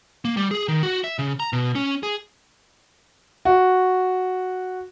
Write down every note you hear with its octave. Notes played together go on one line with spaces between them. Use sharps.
A#3
G3
G#4
D#3
F#4
E5
C#3
A#5
B2
C#4
G#4
F#4